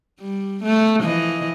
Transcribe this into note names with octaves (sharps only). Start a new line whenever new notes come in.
G3
A3
E3 F3 D#5